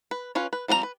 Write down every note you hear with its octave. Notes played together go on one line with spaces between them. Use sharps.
B4
C#4 F4 B4 C#5
B4
F3 G3 C4 D4 A#5
B4